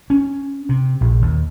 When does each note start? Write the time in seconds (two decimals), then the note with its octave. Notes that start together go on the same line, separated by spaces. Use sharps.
0.10 C#4
0.69 C3
1.01 A#1
1.22 D#2